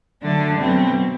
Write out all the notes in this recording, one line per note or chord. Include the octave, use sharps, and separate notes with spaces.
D3 F#3 A3 D4
B2 F#3 C4